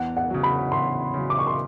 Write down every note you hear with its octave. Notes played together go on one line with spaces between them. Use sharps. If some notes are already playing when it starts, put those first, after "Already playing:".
Already playing: E2 F#5
F#5
C#3 F#3
B5
E2 C6
C#3 F#3
D6
C#6
C6